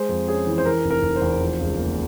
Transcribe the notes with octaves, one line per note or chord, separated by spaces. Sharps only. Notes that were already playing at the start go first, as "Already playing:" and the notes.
Already playing: G#3 C5
F2
C#4 G#4
E3
C5
E3 A#4
F1
A#4
F1
C5
E2
F3
C#2
A#3